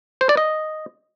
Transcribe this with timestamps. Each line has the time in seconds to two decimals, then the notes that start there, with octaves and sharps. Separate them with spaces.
0.21 C5
0.29 D5
0.37 D#5